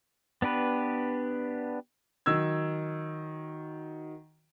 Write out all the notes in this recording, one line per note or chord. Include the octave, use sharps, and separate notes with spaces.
B3 D4 G4 B4
D#3 F#3 E6 G#6